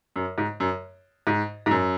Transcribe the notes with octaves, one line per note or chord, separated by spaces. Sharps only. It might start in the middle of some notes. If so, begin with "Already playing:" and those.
F#2
G#2
F#2
G#2
G#2
F#2